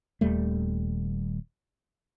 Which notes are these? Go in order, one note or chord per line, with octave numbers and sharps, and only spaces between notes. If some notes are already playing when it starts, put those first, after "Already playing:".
D#1 D#2 G3 A3